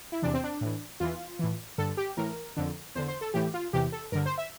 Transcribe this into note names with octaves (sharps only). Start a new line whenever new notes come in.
E4
E2 C3 E3 D4
C4
D4
A2 E3
E2 E3 F4
A2 E3
G2 D3 A4
G4
A2 E3 A#4
F2 D3
E2 D3 C5
C5
A4
A2 E3 G4
F4
E2 C3 E3 G4
A4
G2 D3 A#4
C5
E5